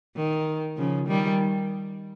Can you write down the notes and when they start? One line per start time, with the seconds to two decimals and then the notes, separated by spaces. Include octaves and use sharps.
0.16 D#3
0.76 C#3 F3
1.07 D#3 G3